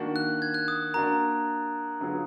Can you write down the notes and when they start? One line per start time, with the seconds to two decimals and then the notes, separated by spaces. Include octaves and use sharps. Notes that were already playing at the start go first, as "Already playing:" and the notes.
Already playing: D#3 A#3 D4 F#4
0.16 F#6
0.42 G#6
0.54 F#6
0.68 D#6
0.94 A#3 D4 F#4 A#4 A#5
2.00 D3 F#3 B3 F4 G#4